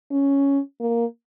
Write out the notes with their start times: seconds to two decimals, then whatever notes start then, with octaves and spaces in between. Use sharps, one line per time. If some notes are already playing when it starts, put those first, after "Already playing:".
0.11 C#4
0.80 A#3